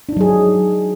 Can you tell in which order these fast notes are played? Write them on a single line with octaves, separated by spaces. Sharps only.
D4 D#4 F#3 G#4